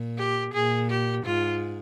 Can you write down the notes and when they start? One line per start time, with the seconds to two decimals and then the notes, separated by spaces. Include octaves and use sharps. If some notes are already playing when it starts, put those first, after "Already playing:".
Already playing: A#2
0.18 G4
0.54 A#2 G#4
0.90 G4
1.24 G#2 F4